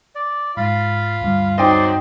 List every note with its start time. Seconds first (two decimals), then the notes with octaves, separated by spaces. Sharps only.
0.15 D5
0.57 G#2 F4 F5 B5 A6
1.21 D2 G2
1.58 F#3 C4 D#4 D5 G5 C6